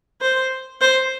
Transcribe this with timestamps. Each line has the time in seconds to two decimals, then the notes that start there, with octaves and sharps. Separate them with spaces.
0.21 C5
0.81 C5